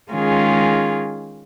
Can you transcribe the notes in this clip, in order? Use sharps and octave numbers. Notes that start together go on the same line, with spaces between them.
D#3 G#3 C#4 F4 G#4